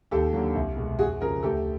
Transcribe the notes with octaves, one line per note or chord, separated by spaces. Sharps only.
D#2 G4 A4
D3 F#3 A#3
C2
B2 G#3
F2 F#4 G#4
C#3 F3 G#4 A#4
D2 G4 A4